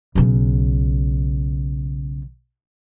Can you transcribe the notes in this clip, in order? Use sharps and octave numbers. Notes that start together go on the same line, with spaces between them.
B1 C#3